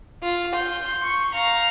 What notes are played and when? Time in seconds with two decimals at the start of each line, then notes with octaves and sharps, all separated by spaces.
0.23 F4
0.56 C6 G6
1.04 C#6
1.35 F5 A#5